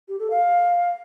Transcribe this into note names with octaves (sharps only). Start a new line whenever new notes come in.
G4
A4
F5